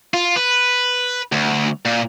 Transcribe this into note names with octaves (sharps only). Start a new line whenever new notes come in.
F4
B4
D2
A#2